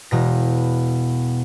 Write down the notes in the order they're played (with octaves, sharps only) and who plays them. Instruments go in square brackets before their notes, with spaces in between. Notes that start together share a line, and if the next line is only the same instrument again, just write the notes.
[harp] E1 B2 A#6